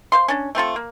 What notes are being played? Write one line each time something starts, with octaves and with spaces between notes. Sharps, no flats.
C5 F5 C6
C#4 D4
A3 C4 F4 A4
A#3